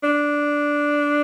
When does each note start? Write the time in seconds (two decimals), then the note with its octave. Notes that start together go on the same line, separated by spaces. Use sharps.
0.03 D4